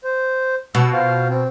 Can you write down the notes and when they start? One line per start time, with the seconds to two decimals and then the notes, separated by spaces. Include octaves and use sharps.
0.04 C5
0.75 B2 E6
0.93 F4 C5 F5
1.29 C4